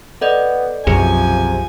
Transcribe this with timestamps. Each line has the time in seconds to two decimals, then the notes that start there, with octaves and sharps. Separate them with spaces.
0.21 B3 A4 D5 D#5
0.87 B1 F#2 C3 F3 G#4 G#5